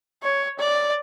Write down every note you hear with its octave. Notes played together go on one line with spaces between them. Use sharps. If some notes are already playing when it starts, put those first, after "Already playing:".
C#5
D5